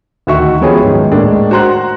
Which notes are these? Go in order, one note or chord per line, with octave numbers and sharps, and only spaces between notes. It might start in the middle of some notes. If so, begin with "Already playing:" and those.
D2 D#3 F#4 E5 C#6
F3 F#3 B3 C#4 G4 G#4
G#2 D#3
A2 G#3 A#3 D4
F#4 C5 A#5 C6 F#6